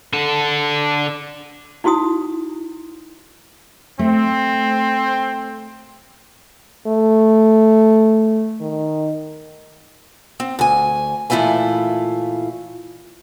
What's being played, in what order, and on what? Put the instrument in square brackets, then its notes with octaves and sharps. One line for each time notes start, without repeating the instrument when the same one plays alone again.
[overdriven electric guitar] D3 A4
[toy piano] D#4 E4 F#4 C6 D#6
[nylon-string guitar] A3 [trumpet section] C4
[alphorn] A3
D#3
[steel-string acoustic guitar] C4
D2 G#5
A#2 E3 A3 E4 F4 G#5